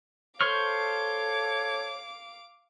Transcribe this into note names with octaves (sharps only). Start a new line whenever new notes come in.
A4 C5 C#5 F5 C#6 D6 F6